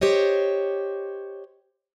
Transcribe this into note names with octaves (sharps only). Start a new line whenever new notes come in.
G4 C5 C#5 D#5